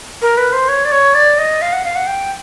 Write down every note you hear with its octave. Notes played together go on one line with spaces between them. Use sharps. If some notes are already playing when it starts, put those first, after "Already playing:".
A#4
B4
C5
C#5
D5
C#5
D5
D#5
F5
F#5
F5
F#5
G5